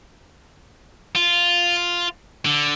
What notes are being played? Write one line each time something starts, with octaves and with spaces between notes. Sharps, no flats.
F4
D3